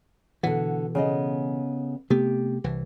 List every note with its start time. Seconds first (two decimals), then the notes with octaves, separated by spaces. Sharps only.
0.43 B2 D3 E3 F#5
0.95 C#3 B3 D#5
2.10 C3 A3 B3 G4
2.64 C2 E3